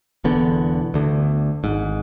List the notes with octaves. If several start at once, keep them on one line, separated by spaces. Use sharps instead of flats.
E1 E2 D3 B3
D2 D3
G#1 G#2